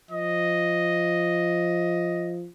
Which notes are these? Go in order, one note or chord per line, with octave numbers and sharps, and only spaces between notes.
F3 D#5